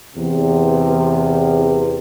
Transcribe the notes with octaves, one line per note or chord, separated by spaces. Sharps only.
E2 C3